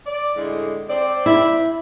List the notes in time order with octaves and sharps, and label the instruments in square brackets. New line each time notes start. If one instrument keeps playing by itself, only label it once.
[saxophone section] D5
A2 D3 G#3
C4 D5
[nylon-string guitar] E4